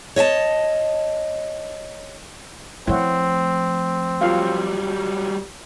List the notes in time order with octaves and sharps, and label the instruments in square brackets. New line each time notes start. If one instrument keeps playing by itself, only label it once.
[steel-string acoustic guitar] C#5 D#5 E5 A5
[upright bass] F3 A3 [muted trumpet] C4 [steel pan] E4 C#5 F#5
[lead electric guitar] F#3 G3 [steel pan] F4 F5